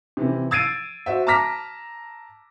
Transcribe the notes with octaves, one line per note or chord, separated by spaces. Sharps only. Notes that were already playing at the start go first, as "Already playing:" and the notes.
C3 E3
E6 G#6 A6 C7 D7 D#7
F#4 C5 E5
A5 A#5 D6 F6 A#6 B6